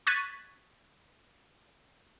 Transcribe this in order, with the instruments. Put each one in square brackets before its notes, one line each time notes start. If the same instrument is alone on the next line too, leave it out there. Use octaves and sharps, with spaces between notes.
[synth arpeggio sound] C#6 F#6 G#6 A6 B6 D#7